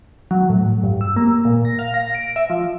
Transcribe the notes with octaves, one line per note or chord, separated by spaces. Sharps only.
F#3
A2
G2
E6
A#3
A#2
A#6
F5
A#6
D7
E5
F3